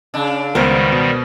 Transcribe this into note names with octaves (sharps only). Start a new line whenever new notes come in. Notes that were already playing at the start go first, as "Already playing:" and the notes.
C#3 D4
C#2 D#3 G3 B3 A#4 C5
B2